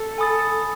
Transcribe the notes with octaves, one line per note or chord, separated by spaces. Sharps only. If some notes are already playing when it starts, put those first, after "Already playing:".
Already playing: A4
G#5 B5 D#6 A6